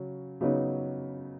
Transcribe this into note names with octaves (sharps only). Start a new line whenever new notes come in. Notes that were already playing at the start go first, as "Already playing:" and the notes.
Already playing: C#3 F#3
C#3 F#3 B3 D#4